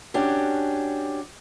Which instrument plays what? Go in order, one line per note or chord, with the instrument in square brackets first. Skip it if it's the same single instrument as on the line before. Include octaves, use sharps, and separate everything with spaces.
[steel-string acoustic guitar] C#4 D4 F#4 G4